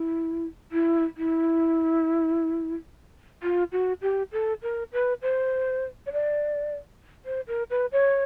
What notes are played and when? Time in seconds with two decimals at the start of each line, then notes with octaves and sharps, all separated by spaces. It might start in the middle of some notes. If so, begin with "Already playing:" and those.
Already playing: E4
0.72 E4
1.17 E4
3.43 F4
3.72 F#4
4.02 G4
4.32 A4
4.63 A#4
4.93 B4
5.22 C5
6.06 C#5
6.13 D5
7.25 C5
7.48 A#4
7.70 B4
7.92 C#5